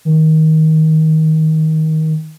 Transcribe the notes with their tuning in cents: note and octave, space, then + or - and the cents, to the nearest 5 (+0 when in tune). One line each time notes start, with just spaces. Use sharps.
D#3 +20